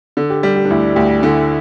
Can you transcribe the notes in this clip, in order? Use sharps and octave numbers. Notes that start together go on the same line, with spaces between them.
D3
G4
G3 G4
G4
D4
D2 E4
D2 G4
D3 E4